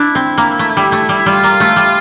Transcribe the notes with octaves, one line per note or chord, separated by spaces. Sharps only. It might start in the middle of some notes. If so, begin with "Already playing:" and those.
Already playing: D4 E4
C4
A#3
A3
G3
A3
G3
G3 F4
A#3
A3
G3